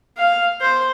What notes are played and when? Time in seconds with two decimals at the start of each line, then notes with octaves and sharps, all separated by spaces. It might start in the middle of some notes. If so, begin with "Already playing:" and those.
0.18 F5
0.61 C5